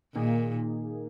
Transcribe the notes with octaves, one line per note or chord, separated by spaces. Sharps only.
A#2 D#3 A#3 D#4 G#4